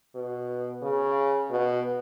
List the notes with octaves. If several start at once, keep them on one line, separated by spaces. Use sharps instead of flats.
B2
C#3
B2